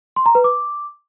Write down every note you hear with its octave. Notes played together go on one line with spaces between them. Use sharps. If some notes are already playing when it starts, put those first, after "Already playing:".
C6
A#5
B4
D6